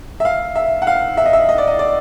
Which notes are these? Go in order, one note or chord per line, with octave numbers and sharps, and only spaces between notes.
E5
F5
E5
F#5
F5
E5
D#5
E5
D#5
D5
D#5
D5